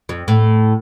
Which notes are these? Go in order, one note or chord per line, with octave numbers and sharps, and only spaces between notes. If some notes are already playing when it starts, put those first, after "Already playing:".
F2
A2